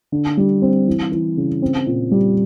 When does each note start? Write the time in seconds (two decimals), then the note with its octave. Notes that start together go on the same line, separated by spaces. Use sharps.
0.12 D3
0.37 G3
0.62 C4
0.87 E3
1.12 E3
1.37 C#3
1.62 C4
1.86 A#2
2.11 G3